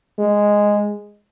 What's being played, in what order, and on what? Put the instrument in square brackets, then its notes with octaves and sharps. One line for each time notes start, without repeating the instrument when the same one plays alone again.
[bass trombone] G#3